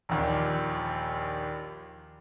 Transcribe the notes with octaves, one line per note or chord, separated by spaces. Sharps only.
A#1 D#2